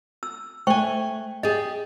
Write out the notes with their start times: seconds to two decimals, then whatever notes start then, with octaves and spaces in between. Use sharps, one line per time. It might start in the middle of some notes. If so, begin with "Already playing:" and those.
0.23 E6
0.67 A3 C5 G5 G#5 C#6
1.43 G4 G#4 D#5